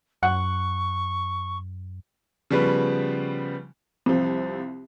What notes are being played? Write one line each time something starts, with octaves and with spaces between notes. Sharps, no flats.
F#2 F#5 C#6
C#3 F3 G3 B3 B4
C2 C3 F3